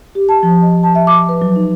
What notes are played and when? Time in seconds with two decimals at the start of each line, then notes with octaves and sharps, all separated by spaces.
0.15 G4
0.29 A5
0.43 F3
0.62 D#5
0.83 A5
0.95 E5
1.07 D6
1.29 B4
1.42 F#3
1.56 D#4